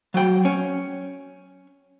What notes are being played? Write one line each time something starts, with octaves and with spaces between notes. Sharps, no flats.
F#3 G5
C#4